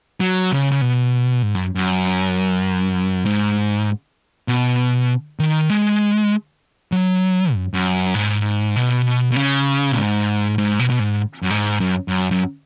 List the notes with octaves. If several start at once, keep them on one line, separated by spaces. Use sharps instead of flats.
F#3
C#3
C#3
B2
G#2
F#2
F#2
G#2
B2
D#3
G#3
F#3
F#2
F#2
G#2
B2
B2
C#3
B2
G#2
G#2
B2
B2
G#2
F#2
G#2
F#2
F#2
F#2